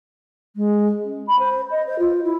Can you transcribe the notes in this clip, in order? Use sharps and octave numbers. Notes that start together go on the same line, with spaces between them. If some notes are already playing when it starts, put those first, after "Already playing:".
G#3
C#4
B5
C5
D#5
C5
F4
E4